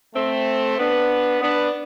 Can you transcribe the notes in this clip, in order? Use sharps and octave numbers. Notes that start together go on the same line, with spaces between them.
A3 C4
B3 D4
B3 D4